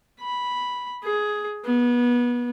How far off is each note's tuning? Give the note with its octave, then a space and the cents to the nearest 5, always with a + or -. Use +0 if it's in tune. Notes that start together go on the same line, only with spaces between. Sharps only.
B5 -5
G#4 +10
B3 -25